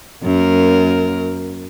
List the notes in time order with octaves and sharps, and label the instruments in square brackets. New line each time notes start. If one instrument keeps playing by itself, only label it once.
[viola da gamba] F#2 A#3 A#4